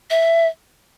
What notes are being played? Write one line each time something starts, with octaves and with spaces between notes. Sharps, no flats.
E5